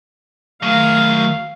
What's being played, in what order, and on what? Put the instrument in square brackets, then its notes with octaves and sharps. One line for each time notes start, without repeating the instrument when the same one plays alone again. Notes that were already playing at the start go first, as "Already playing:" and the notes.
[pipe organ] D#3 A3 [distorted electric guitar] F#3 G#4 [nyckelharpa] F5